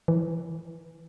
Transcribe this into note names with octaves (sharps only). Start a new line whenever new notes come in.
E3